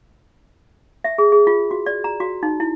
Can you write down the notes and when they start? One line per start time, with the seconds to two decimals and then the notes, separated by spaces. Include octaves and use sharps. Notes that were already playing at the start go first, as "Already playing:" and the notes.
1.04 E5
1.18 G#4
1.32 G#4
1.47 F4
1.71 F#4
1.86 D5
2.04 A#5
2.20 F#4
2.43 D#4
2.60 E4